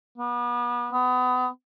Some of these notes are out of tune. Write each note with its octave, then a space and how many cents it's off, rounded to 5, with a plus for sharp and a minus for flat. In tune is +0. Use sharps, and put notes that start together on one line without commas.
B3 -35
B3 +30